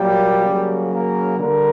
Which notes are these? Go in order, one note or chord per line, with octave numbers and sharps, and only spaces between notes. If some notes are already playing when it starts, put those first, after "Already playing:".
Already playing: A#2 F#3 G3 A#3 G4
C#3 F#3 A#3
A#3 A#4
D3 G3 A#3 A#4